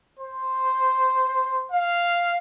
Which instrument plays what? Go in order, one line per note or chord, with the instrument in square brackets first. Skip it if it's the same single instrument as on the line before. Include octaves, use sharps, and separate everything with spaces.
[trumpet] C5
F5